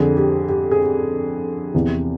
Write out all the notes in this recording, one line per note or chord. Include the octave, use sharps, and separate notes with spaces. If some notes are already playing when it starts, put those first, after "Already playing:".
Already playing: F2 D3 G#4
G4
G4
G#4
G4
E2 C3 E3